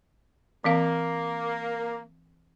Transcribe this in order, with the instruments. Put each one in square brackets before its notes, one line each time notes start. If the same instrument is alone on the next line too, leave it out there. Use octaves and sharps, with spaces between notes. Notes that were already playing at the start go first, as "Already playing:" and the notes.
[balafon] E3 C4 F5 [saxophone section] A#3